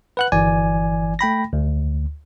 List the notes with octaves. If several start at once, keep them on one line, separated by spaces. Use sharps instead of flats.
B4 F#5 F#6
G1 E3 D5 G#5
A3 G5 B5 A#6
D2